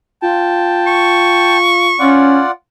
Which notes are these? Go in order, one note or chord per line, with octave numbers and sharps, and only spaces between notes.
F4 G5 A5
C#6
C#4 F4 D5 F#5